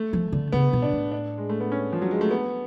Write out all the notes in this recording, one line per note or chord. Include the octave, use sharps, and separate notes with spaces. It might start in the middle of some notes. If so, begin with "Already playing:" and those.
Already playing: A3
F3
D3
C#3 B3
B2
D4
A2
D4
G#3
A3
B3
C#4
F3
F#3
G#3
A3
B3